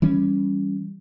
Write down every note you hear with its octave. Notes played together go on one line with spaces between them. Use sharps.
E3 G3 C#4